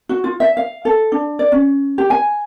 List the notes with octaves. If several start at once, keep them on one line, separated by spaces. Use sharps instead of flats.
F#4
F4
E5
F5
A4
D4
D5
C#4
G4
G#5